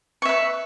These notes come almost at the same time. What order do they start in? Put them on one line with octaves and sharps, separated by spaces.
C#6 E5 B4